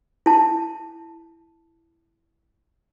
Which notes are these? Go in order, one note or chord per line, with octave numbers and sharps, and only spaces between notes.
E4 A5